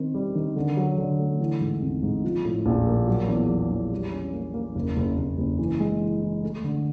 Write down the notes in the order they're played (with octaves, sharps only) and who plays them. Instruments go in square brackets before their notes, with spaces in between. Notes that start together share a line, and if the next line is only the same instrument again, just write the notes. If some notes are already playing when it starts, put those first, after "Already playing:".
Already playing: [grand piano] D#3 C4
G3
D#3
D3
F#3
D3
A3
E3
G#2
G#1
G#2
F3
A2
A#1
A#3
F#3
E2
F#3
E2
G3
C#4
A#3
A#3
F#1
F#1
F#1
F#1
E3
G#3
E3
E3
A3
D3